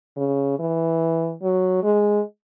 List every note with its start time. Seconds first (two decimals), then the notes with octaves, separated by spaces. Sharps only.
0.17 C#3
0.59 E3
1.43 F#3
1.83 G#3